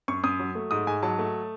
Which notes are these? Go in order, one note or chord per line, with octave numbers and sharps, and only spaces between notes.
F#2 C#6
F#2 D#6
F#3
A3
G#2 D#6
G#2 G#5
F#3 A5
A3